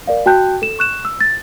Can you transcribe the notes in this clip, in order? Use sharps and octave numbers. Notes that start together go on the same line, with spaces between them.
A#4 D5 F5
F#4 G5 A5 F#6 G6
A4 E7
C#6 F#6 E7
E6
A6